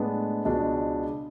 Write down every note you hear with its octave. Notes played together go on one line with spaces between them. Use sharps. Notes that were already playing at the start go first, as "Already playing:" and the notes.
Already playing: A2 G#3 B3 D4
C#2 B2 G#3 D4